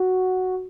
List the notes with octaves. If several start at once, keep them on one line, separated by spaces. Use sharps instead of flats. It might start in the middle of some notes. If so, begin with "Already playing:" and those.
Already playing: F#4